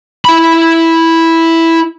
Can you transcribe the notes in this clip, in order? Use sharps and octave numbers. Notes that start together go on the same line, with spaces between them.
E4 B5